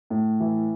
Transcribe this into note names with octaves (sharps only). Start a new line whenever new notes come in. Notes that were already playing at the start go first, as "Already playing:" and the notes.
A2
E3